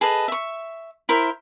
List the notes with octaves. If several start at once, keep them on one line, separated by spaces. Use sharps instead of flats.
G#4 A4 B4 D#5
E5 C#6
E4 A#4 C5 E5